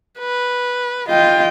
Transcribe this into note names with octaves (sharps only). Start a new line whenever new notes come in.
B4
F4 D#5 G5